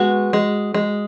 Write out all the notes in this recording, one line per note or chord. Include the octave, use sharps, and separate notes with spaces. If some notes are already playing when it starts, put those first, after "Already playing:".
Already playing: G#3 B3 F#4
G#3
G#3